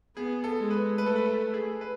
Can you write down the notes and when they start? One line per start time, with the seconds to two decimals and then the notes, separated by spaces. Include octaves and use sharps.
0.16 B3 G#4
0.44 A4
0.58 G#3
0.70 B4
0.98 A3 B4
1.06 A4
1.16 B4
1.26 A4
1.54 G#4
1.81 B4